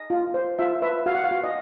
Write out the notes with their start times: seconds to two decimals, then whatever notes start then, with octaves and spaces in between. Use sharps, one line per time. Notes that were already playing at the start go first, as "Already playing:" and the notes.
Already playing: D#5
0.10 F4
0.34 C5
0.59 F4 E5
0.82 B4 E5
1.06 F#4 F5
1.15 F#5
1.24 F5
1.31 F#4
1.44 D#5